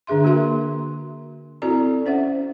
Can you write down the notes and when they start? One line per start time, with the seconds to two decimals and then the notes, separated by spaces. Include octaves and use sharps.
0.07 D3 D4 G#4 E5 C6
0.24 A#3 F#4 G#4 A#4 E5 C6
1.62 C4 E4 F#4 A4 D5 A#5
2.06 C#4 C5 E5 F#5